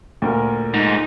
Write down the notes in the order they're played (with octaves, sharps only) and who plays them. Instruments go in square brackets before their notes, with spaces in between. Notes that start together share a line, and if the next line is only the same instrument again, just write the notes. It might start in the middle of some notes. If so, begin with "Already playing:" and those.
[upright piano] D2 A#2 A#4
[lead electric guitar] G#2 [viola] D#4